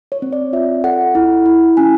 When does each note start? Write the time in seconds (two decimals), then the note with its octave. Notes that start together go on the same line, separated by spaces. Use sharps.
0.12 C#5
0.22 C4
0.33 D5
0.53 F4 E5
0.84 A4 F#5
1.15 E4
1.46 E4
1.77 C#4 G#5